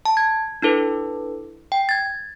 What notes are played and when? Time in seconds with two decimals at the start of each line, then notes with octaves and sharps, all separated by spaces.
0.05 A5
0.17 G#6
0.62 D4 E4 A4 B4
1.72 G5
1.89 G#6 A6